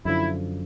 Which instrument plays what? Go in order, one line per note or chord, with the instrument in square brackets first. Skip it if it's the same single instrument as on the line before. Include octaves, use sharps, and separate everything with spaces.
[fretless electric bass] F#2 D3 F3 [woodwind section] E4